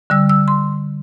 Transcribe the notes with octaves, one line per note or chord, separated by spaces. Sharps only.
D3 G3 E6
E6
C6